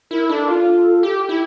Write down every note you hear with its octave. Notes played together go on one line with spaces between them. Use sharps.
E4 A#4
D4 A4
F4
G4
E4